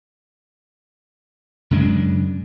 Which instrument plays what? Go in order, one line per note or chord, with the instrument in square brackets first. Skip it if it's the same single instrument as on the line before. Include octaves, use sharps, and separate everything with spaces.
[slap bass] F#2 C#3 G#3 D4